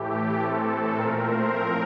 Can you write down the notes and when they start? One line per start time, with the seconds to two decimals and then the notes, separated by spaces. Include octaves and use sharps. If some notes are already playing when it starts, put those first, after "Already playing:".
Already playing: A2 E3 A3 G4
0.12 G4
0.40 A2 E3 A3 C4 A4
0.96 A#2 A3 C4 A#4
1.25 C5
1.53 A2 F3 C4 A#4